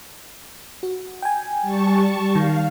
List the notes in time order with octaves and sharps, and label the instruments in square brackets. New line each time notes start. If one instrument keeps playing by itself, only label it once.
[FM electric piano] F#4
G5 G#5
[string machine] G3 A5 C#6
[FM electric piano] D#3 [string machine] F5